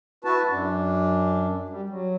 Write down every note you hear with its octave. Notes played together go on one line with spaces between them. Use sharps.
E4 F#4 B4 A5
F#2 D4
G3
F#3